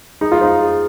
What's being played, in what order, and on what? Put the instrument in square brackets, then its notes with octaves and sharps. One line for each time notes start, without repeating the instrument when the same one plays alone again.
[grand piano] D#4 [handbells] G#4
[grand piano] F4
[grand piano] D#4 [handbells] C5 F5
[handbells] G#4